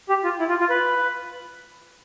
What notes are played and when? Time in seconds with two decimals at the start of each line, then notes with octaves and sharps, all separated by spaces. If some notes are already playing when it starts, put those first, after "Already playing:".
0.09 G4
0.24 F4
0.39 E4
0.49 F4
0.60 F4
0.70 B4